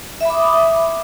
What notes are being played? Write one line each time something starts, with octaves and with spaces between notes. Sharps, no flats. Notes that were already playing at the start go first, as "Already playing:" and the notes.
E5 B5 D6 D#6